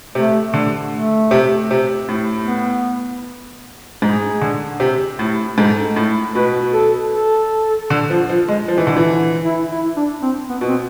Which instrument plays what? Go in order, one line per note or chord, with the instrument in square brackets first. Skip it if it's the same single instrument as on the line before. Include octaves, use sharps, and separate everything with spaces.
[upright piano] C3 [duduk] A3
[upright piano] D3
[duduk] A3
[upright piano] C3
C3
A2
[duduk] B3
[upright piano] G#2 [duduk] G#4
[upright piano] D3
C3
A2
[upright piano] G#2 [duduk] A4
[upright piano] A2
[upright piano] B2 [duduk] B4
[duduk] A4
A4
[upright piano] D3
F3
F3
G#3
F3
E3
D3
E3
[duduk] E4
E4
D4
C4
B3
[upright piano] B2
[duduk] C4